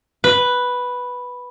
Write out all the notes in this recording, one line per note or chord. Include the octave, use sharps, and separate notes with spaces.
B4